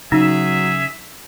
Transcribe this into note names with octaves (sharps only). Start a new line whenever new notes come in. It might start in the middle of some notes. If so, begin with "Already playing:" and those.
C#3 F#3 D#4 G#4 E5